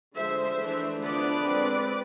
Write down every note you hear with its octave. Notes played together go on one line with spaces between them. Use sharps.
D3 F3 G#3 C5 E5
E3 A3 D4
D3 F3 B3 D4 B4 D5
G#3 C4